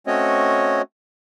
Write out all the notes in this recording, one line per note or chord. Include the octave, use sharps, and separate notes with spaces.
A3 C4 C#4 F#4 C#5 D#5